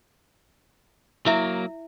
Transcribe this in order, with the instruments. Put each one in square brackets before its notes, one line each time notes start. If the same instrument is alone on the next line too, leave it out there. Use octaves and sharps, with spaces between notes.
[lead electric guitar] F#3 A#3 [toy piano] E4 E5